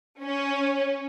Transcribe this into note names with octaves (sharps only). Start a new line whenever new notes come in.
C#4